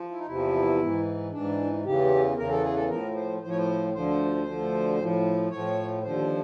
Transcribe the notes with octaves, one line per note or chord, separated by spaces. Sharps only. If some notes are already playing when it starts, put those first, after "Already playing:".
Already playing: F3
E4
D#4
E2 C3 F3 E4
G#2 E3
G#2 E3 D4
E2 C#3 E3 G4
E2 C#3 E3 A#4
A4
G#4
A4
A2 F3 A#4
C5
A2 F3 C5
C#5
C5
D2 D3 F3 C5
D2 D3 F3
A2 F3
A2 F3 C#5
D#2 D3 F3 C5